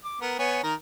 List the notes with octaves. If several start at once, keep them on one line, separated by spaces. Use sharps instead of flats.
D6
B3 A#4
B3 C#5 G#5
D#3 A#4 A#5